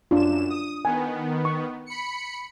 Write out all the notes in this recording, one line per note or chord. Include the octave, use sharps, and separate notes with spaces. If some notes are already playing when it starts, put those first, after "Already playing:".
F#2 D4 F4 E7
D#6
D#3 B3 G#5
C#6
B5 C#7